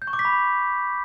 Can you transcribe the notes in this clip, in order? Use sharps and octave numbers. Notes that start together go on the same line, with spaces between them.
G6
C#6
D6
B6
B5